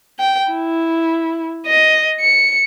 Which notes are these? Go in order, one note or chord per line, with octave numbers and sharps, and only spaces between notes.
G5
E4
D#5
C#7